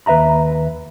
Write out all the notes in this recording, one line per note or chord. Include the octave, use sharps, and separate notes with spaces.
D#2 B4 E5 A#5 B5